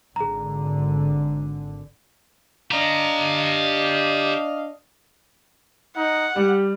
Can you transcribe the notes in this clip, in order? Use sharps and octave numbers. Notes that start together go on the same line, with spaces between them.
G#1 D3 G#4 A#5
D4 G4 D#5 F5 A#5
D#4 F#5
G3 G4